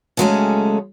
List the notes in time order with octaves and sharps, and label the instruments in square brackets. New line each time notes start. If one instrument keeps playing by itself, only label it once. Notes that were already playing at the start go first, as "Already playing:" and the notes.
[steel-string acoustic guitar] C#3 F#3 G#3 A3 C#4 A4